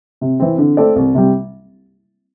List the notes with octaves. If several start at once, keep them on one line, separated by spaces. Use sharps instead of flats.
C3
E3 C4
D3
A3 C4 A4 D5
C2
C3 G3